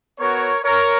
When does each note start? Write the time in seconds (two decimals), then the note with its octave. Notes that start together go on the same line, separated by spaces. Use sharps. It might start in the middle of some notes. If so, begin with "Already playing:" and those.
0.19 B3 F#4 A#4 C#5
0.64 A#4 C#5